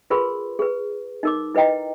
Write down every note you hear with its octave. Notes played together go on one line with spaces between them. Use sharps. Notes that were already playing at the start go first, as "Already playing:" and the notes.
F4 G#4 A#4 B4 C6
G#4 B4
D#4 A#4 D6
E4 B4 D#5 G5 A#5